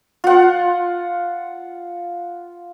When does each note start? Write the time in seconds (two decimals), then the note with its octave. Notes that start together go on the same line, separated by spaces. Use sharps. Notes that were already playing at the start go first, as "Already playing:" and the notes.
0.24 F4 F#5